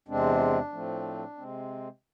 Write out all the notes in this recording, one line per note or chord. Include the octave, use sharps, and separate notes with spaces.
E2 C3 G#3 C4 D4
A2 F3 A3 C4
C3 G#3 C4